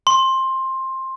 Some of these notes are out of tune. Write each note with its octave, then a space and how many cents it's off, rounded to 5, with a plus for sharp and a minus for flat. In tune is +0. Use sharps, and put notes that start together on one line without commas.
C6 +15